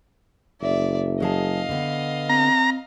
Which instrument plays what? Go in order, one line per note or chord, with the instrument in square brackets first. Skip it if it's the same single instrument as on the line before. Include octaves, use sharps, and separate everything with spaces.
[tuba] F#1 [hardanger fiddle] D5 E5
[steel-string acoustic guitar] F#3 G#4 A5 [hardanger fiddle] D#5 F5
[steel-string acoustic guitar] D3 B3
[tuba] C4 [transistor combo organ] A#5